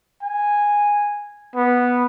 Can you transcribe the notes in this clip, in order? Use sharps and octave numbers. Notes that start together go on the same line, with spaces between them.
G#5
B3